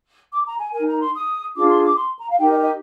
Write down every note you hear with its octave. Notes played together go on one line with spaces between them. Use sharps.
D6
A#5
G#5
D#4 A#4 G#5
A#5
C6
D#6
D4 F4 G#4 D6
C6
D6
C6
A#5
F5
D#4 G4 A#4 G5
D#5
D#5